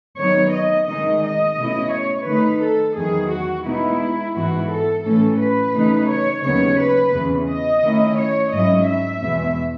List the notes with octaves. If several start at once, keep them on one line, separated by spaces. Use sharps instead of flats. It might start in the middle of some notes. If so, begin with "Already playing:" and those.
D#3 F#3 B3 D#4 C#5
D#5
D#3 G#3 D#4 D#5
D#5
B2 A3 C#4 E4
C#5
D#3 A3 D#4 B4
A4
E2 D#3 F#3 G#4
F#4
B2 G#3 B3 D#4 E4
G#2 E3 B3 E4 F#4
A4
A2 E3 A3 C#4 A4
B4
C#3 E3 A3 D#4
C#5
D#2 C#3 F#3 B3 C#5
B4
E2 C#3 E3
D#5
D#3 A3 C#4 E4
C#5
G#2 F#3 C#4 E4 D#5
E5
E2 B2 G#3